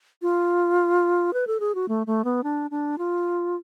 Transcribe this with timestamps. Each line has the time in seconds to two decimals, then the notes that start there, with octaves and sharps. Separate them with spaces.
0.22 F4
1.33 B4
1.47 A4
1.60 G#4
1.75 F#4
1.88 A3
2.07 A3
2.24 B3
2.44 D4
2.71 D4
2.98 F4